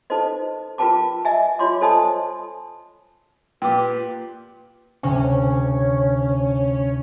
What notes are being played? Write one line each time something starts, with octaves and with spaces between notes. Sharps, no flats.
D#4 A4 B4 C5 D#5
F4 A#4 B4 G5 A5 D6
D#5 E5 G#5
F4 C#5 C6 D6
A4 C5 D#5 G#5 A5 D#6
A#2 F4 G4 B4 G5 D6
D2 C3 C#4